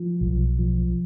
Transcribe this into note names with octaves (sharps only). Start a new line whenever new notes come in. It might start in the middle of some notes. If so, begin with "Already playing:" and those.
Already playing: F3
B1
F3